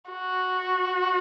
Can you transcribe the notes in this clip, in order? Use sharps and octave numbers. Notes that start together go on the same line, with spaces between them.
F#4